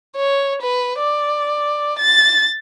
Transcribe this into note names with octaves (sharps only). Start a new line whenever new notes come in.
C#5
B4
D5
A6